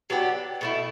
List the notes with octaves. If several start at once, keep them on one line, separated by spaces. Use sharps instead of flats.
F#3 B3 D4 G4
B2 A3 E4